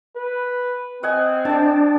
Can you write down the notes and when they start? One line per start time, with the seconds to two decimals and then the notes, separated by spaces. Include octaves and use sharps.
0.17 B4
1.03 C4 D#5 F#5 G#5
1.45 D4 G5 A5